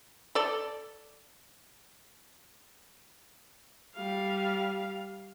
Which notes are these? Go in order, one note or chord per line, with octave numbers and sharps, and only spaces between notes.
A4 D5
G3 F5